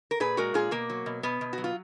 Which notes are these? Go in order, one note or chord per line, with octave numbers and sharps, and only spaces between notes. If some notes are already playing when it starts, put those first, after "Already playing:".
A#4
A#2 G#4 B4
G#3 F#4 A#4
A#2 F4 G#4
B2 A#3
F#3
B2
B2 B3
B2
F#3 F#4
F4